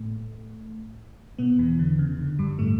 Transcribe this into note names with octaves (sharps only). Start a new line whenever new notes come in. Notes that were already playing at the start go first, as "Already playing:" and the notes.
Already playing: A2 A3
B2 B3
E2 E3
D3
C#3
D3
G2 G3
A2 A3